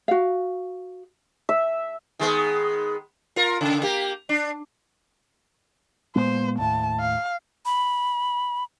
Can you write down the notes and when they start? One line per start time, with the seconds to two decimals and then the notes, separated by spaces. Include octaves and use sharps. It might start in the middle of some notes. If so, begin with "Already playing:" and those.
0.08 F#4 F5
1.49 E5
2.19 D#3 G#3 B3
3.36 F4 A#4
3.61 C#3
3.83 A#3 G4
4.29 D4
6.16 A#2 G#3 B3 C5
6.59 D#2 A2 A5
7.00 F5
7.66 B5